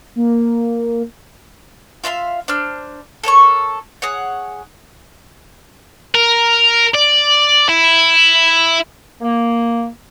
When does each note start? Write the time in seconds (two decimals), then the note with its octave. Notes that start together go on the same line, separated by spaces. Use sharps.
0.16 A#3
2.04 F4 E5 F5 C6
2.48 D4 C5 F6
3.23 A4 A#4 C#5 C#6
4.02 G#4 C#5 F#5
6.15 A#4
6.94 D5
7.69 E4
9.21 A#3